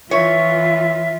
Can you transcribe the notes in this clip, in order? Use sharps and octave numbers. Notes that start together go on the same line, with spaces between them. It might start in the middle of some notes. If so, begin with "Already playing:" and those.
E3 F4 C#5 E5